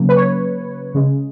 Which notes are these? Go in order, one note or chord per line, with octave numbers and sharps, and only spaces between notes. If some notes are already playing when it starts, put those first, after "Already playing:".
Already playing: C#3 F#3 A#3
B4
C#5
C#3 G#3